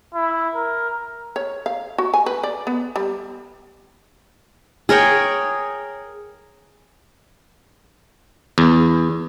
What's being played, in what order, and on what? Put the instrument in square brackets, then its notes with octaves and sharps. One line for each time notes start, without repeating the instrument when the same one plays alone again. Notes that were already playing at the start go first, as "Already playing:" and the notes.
[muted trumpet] E4
A#4
[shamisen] C#5
F5
F#4
G#5
B4
D5
B3
G3
[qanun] G#4 A#4 C#5 G5
[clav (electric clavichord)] E2